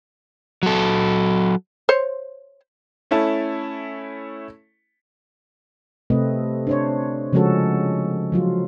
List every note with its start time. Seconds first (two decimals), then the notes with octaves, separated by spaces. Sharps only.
0.63 F#3 A4
1.89 C5 C#5
3.11 A3 C#4 E4 A5
6.10 C3 A3 C4 B4 D#5
6.67 D4 C5 C#5
7.33 C#3 F3 G#3 C#4 F#4 A4
8.32 F3 F#3 F4